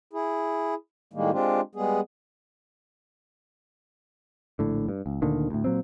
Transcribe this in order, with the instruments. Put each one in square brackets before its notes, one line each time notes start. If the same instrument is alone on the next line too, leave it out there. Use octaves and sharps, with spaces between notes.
[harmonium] E4 G#4
A2 D#3 G3 G#3 A#3
G#3 C4 D4 F4 G4
G3 G#3 B3 G#4
[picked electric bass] A#1 A2 D3
G2
C#2
D2 A#2 D3 D#3
D2 A2
A#2 F#3 C4